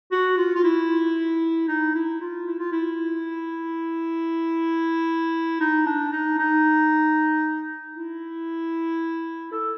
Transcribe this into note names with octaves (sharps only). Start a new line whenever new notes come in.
F#4
F4
F4
E4
D#4
E4
F4
E4
F4
E4
D#4
D4
D#4
D#4
E4
A4